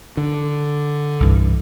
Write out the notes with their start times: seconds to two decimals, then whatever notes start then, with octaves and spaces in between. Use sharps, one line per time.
0.17 D3
1.20 C2 G2 E3